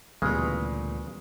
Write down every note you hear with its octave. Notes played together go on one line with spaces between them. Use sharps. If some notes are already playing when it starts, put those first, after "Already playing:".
D2 A#2 C#3 E3 G3 G#3 B3